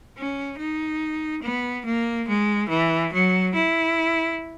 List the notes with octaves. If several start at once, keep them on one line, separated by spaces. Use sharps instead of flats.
C#4
D#4
B3
A#3
G#3
E3
F#3
E4